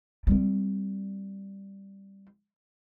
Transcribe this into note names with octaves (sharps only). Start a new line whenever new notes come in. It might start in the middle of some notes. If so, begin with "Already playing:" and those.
G3 C4